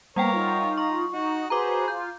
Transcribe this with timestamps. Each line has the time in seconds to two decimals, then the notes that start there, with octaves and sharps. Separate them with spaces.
0.16 G3 A#3 B3 A#4 C#5 F#5 G5
0.33 D#4 F4
0.78 A#5 C#6
1.13 D#4 F#4
1.50 F#4 G#4 B4 C5 A#5 D6
1.88 F4 G6